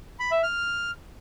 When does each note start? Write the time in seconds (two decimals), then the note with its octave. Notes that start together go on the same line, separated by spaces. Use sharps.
0.20 B5
0.31 E5
0.43 F6